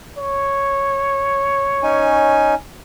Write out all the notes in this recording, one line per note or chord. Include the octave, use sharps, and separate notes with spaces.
C#5
C#4 D#4 G#5